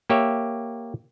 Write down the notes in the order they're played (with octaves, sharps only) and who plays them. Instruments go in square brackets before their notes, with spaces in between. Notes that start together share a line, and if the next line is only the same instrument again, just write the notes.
[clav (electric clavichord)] A#3 G4 C#5 E5